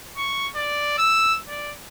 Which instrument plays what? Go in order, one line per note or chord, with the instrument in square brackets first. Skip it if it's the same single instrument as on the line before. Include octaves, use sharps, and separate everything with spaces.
[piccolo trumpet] C#6
D5
E6
D5